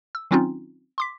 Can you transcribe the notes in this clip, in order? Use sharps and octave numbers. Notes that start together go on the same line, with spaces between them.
E6
D#3 F#3 C4 C#4 D#4 F4
C6 D6 B6